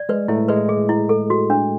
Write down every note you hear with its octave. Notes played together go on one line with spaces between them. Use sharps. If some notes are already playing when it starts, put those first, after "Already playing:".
Already playing: D5
G#3 B4
A2 A3 E4
G#3 B4
G#4
E4
A4
F#4
D4